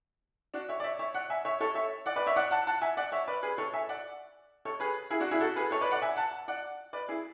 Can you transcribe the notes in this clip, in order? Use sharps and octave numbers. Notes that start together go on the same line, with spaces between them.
D4 F#4
C#5 E5
D5
C#5 E5
C#5 E5
D5 F#5
E5 G#5
C#5 E5
A4 C#5
C#5 E5
D5 F#5
B4 D5
C#5 E5
D5 F#5
F#5 A5
F#5 A5
E5 G#5
D5 F#5
C#5 E5
B4 D5
G#4 B4
A4 C#5
E5 G#5
D5 F#5
A4 C#5
G#4 B4
E4 G#4
D4 F#4
E4 G#4
F#4 A4
G#4 B4
A4 C#5
B4 D5
D5 F#5
E5 G#5
F#5 A5
D5 F#5
B4 D5
E4 G#4